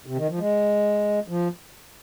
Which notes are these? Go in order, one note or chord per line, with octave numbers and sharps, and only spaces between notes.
C3
D#3
F3
G#3
F3